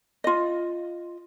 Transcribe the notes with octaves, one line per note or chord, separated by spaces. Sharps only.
F4 D#5